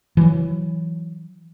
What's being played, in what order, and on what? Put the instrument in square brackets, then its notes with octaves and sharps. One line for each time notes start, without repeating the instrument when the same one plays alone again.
[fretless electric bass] E3 F#3